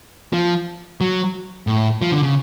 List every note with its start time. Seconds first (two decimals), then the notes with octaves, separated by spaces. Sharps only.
0.33 F3
1.01 F#3
1.67 A2
2.02 F3
2.12 D3
2.23 C#3